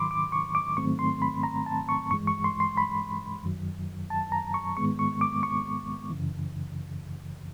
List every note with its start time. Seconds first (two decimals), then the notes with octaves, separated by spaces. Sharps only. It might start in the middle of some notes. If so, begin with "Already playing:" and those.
Already playing: G#2 D#3 F#3 B5 C6 D6
0.11 D6
0.32 C#6
0.55 D6
0.77 G#2 D#3 F#3 A3 C4 C#6
0.99 C6
1.22 B5
1.43 A#5
1.66 A5
1.89 C#6
2.11 G2 E3 G#3 C#6
2.27 C#6
2.44 C6
2.60 C6
2.77 B5
3.43 F#2 D#3 F#3
4.10 A5
4.32 A#5
4.54 C#6
4.77 G#2 D#3 G#3 B3 C#6
4.99 C#6
5.21 D6
5.43 C#6
6.10 F#2 C#3 E3